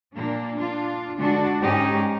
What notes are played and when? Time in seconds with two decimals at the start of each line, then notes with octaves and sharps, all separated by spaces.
0.15 A#2 A#3 D4
0.57 D4 F4
1.18 D3 G#3 D4 F#4
1.62 G#2 G#3 C#4 D#4 G4 G#4